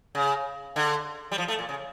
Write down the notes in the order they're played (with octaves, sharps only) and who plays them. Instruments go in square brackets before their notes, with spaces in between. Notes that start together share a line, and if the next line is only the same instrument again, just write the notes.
[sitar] C#3
D3
G3
F3
A3
A#2
C#3